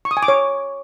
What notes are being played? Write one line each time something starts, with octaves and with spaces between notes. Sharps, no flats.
C#6
D#6
G#5
D6
C#5